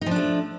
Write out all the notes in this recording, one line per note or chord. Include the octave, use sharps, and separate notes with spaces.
F3 A3 D4 D#4